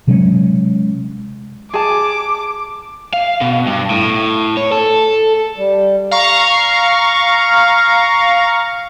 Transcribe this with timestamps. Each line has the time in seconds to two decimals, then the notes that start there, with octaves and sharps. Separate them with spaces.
0.07 C3 F#3 G#3 C#4
1.74 G#4 A5 D6
3.13 F5
3.41 B2
3.67 G2
3.90 A2
4.57 C#5
4.72 A4
5.57 G3
6.11 F5 A#5 C#6